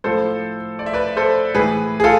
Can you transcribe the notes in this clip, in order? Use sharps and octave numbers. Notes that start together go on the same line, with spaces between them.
A2 F3 A4 C5
D5
E5
B4 D5
A4 C5
A2 E3 G#4 B4
G#4
F4 A4